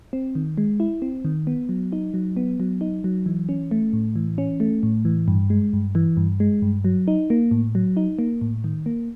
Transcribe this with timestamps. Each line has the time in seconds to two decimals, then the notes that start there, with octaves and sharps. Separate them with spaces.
0.13 C4
0.35 D#3
0.58 G#3
0.80 E4
1.02 C4
1.25 D#3
1.47 B3
1.69 F#3
1.92 D#4
2.14 F#3
2.36 B3
2.60 F#3
2.81 D#4
3.04 F#3
3.26 E3
3.49 C#4
3.71 A3
3.93 A2
4.16 E3
4.38 C#4
4.60 A3
4.83 A2
5.05 E3
5.28 G2
5.50 G#3
5.73 G2
5.95 E3
6.17 G2
6.40 G#3
6.62 G2
6.84 F#3
7.08 D#4
7.30 A#3
7.51 A2
7.75 F#3
7.97 D#4
8.19 A#3
8.41 A2
8.64 D#3
8.86 A#3